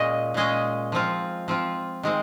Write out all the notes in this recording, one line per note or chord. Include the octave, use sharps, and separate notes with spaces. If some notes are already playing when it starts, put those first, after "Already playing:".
Already playing: A#2 G#3 C#4 G#4 D#5
A#2 G#3 C#4 G#4 D#5
F3 C4 F4
F3 C4 F4
D#3 G#3 C4